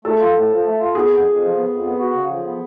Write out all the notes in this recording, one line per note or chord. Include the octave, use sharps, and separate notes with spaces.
A3 A4
F4
A2
F3
A3
F4
B3 G#4
F2
F2
F3
B3
F2
B3
F#4
C#3
F3
B3